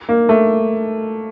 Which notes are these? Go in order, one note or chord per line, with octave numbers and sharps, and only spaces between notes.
A#3
A3